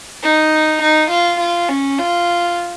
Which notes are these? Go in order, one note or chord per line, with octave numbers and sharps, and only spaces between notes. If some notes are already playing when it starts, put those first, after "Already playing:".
D#4
D#4
F4
F4
C#4
F4